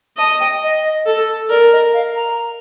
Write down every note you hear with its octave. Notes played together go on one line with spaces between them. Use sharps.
D#5 A5
G5
D#5
A4
A#4 D5
D#5
F5
A#5